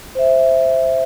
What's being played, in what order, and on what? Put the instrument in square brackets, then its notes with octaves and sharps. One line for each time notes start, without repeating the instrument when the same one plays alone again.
[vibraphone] C5 E5